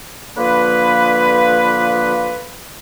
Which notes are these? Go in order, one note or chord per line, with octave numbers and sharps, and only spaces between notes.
D3 F3 A#3 B4